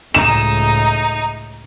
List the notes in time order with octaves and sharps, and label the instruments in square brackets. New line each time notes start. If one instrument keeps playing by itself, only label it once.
[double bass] C#2 A2 [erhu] D#4 [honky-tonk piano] E7